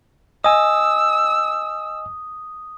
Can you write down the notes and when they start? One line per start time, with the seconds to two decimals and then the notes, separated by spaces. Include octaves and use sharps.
0.44 D#5 G#5 D#6 E6